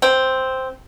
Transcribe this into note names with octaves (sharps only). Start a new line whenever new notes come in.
C4